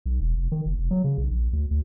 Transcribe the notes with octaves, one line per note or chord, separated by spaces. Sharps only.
B1
E1
F1
D#3
F#1
F1
F#3
C#3
B1
A#1
D2
D2